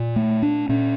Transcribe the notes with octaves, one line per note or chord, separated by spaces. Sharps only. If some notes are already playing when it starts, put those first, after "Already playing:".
Already playing: A#2
A3
D4
A#2 C#4